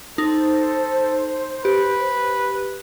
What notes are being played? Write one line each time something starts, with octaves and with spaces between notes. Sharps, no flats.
D#4 A4 C5
G4 B4